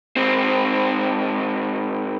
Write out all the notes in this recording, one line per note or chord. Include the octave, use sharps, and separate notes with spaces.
G#2 C4